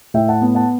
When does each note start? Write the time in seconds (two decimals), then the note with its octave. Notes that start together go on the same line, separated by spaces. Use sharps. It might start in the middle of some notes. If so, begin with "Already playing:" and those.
0.14 A2 E5 G5
0.28 F#5 A5
0.42 B3
0.55 F#5 A5